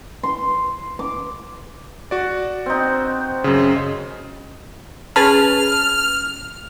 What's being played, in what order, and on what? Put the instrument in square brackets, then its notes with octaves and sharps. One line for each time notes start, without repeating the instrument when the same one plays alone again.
[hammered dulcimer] C6
D6
[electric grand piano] F#4 D5
[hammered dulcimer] C4 D#4
[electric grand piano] F#2 C#3
[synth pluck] C#4 G#4 B4 [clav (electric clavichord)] A5 [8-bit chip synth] F6